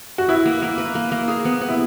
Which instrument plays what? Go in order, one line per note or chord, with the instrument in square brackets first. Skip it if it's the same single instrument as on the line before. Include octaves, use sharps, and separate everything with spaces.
[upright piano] F#4
[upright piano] E4 [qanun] B4
[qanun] A#3
A#3
B4
A#3
A#3
G#4
B3
B3
[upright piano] E4